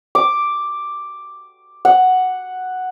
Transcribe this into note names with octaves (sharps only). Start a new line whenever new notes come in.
D6
F#5